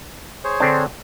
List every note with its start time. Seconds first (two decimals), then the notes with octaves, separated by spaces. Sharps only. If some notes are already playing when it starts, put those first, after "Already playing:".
0.44 G#4 C5 C#5
0.60 D3 C4 D4